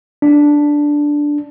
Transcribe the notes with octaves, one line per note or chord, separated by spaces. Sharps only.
D4